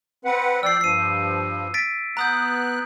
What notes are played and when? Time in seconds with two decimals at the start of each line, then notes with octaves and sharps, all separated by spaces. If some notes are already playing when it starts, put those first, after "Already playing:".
0.25 C4 B4 F#5
0.63 F3 D5 G5 E6 C7
0.81 G2 F3 C7 D#7
1.74 A6 B6 D7
2.17 B3 A#5 D#6 F#6 G6